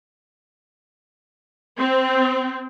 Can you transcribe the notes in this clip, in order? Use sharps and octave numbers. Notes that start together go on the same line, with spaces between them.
C4